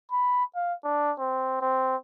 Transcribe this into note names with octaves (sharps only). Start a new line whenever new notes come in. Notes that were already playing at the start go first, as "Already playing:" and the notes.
B5
F5
D4
C4
C4